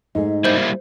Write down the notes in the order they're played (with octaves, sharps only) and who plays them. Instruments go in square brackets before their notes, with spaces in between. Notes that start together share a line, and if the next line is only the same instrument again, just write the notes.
[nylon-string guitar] G#2 A3 G#4 [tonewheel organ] D#4
[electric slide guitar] G3 A#3 E4 [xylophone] C5 G6